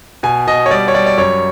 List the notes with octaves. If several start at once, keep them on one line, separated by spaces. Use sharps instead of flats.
B2 G#5
B2 D#5
C#5
G3 D5
C#5
G3 D5
D5
F#2 C#5